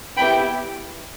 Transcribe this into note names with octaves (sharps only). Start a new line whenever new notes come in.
B3 E4 G4 G5 B5